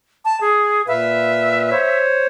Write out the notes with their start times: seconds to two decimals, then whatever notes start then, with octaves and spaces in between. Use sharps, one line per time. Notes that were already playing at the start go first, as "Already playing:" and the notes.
0.25 A5
0.41 G#4
0.88 A#2 B4 E5 F5
1.71 C5 C#5